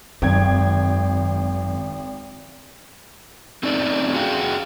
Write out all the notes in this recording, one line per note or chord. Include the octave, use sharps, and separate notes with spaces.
G#1 F#2 G5 G#6
A3 C4 C#4 D#4 D5
F#4 G#4 F5 G5